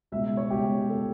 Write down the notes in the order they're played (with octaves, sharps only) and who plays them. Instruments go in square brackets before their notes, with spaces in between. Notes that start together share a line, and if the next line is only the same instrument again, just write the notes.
[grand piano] C#2 B2 E5
C#5
C#2 B2 G4
B2 A4